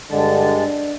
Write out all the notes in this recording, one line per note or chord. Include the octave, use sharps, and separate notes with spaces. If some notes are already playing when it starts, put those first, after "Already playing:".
G2 D3 G#3 A5
D4